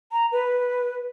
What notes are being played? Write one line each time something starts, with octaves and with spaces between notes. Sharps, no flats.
A#5
B4